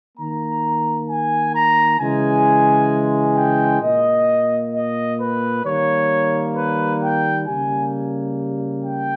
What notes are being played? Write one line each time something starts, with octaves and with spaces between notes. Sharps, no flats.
D#3 A#3 A#5
G#5
A#5
C#3 E3 G#3 G#5
G5
A#2 A#3 D#5
D#5
B4
D#3 G3 A#3 C#5
B4
G5
C#3 G3 A#3 G#5
G5